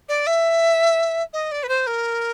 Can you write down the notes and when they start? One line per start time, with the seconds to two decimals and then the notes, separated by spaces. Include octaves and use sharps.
0.09 D5
0.27 E5
1.33 D#5
1.51 D5
1.63 B4
1.69 C5
1.87 A#4